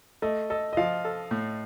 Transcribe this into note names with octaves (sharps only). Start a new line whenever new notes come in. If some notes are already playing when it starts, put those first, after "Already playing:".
A3 D#5
A4 D#5
D#5
F3 F5
A4
A2